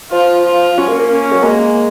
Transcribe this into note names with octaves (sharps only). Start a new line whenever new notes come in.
F3 F4
F4
F#3 C#4
A#3
A#3
C#4
F#3
G#3 A#3